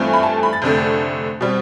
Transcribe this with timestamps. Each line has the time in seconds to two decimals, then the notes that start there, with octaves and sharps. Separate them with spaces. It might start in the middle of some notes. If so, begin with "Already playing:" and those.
Already playing: G2 E3 A3 C4 F4
0.13 B5
0.23 A5
0.43 B5
0.53 A6
0.62 F1 F2 D3 A3 G6
1.41 B2 G3 C4